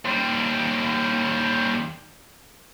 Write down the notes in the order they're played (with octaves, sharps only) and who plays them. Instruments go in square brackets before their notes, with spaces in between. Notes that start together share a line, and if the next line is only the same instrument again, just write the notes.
[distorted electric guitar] D#2 G3